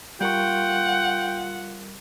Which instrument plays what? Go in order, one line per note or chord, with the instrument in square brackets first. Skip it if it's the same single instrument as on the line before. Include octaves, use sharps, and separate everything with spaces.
[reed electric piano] G3 A#4 C#6 [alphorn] F4 [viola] F#5 [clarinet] G5